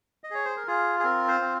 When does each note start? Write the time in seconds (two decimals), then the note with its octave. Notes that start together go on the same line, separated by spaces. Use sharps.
0.24 D#5
0.31 G#4 C#5
0.45 C5
0.57 A#4
0.67 F4 G#4
0.99 G#4
1.04 C4 A#4
1.28 C5
1.41 C4